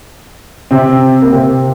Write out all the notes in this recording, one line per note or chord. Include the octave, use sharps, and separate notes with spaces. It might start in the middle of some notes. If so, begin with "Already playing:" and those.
C3 C4
A#3
C3 C4